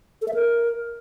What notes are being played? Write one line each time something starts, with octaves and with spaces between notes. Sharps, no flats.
A4
E5
A#4